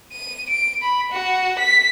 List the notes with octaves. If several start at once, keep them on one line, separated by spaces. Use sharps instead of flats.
D#7
D7
B5
F#4
B6